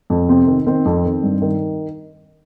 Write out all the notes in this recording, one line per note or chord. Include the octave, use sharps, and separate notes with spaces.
F2
C3 C4
D#3
D#3 C4
F2
D#3
G2
D#3